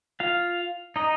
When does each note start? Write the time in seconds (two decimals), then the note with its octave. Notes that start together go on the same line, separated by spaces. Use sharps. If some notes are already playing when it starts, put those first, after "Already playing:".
0.20 F4 F5
0.96 D#4 D#5